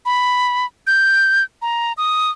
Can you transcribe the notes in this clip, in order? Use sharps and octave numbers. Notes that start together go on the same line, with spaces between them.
B5
G6
A#5
D#6